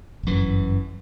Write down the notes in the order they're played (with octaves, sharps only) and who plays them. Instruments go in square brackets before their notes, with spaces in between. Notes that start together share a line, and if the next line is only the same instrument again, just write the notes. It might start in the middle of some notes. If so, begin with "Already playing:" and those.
[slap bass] G1 F#2 E3